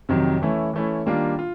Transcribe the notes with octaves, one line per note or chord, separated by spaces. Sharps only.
F2 C3 D#3 F#3
E3 A3 C#4 E4
E3 A3 C#4 E4
D#3 G3 A#3 D4 F4
F4